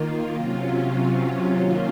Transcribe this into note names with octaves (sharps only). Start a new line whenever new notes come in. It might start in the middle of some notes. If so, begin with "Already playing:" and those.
Already playing: D#3 A#3 F4
C3 F#3 C#4 F4
D#3 F#3 A#3 C#4 F4